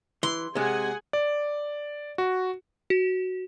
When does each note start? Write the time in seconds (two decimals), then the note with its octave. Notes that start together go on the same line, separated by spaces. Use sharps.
0.23 E3 C6
0.55 C3 G#3 G#4 F#5 G#5
1.13 D5
2.18 F#4
2.90 F#4